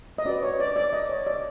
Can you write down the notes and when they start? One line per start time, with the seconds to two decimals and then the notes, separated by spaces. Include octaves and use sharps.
0.18 D#5
0.25 C#4 F#4 B4 D5
0.43 C#5
0.60 D5
0.76 D5
0.93 D#5
1.09 C#5
1.27 D5